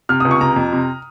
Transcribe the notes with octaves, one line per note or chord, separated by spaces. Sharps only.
C3 F6
D#6
C#2
C#6
C3 A#5
F2
C3